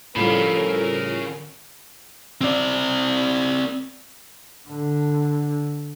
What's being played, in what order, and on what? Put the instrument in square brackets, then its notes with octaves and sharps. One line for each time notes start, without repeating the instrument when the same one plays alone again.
[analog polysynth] A2 F3 G3 [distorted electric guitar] C#3 B5 [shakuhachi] A4 [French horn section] A#4
[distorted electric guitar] C4 D5
[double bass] D3